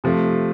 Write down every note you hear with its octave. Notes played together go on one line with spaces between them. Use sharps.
C3 F3 A3